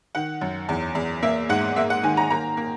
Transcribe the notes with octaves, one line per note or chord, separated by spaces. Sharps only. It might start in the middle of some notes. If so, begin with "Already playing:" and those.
D#3 F#5
F#2
E2
E2
A#3 E5
G#2 F#5
A#3 E5
F#5
D#3 G#5
A#5
A#3 A#5
A#3